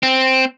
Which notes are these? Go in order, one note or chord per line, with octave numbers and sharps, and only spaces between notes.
C4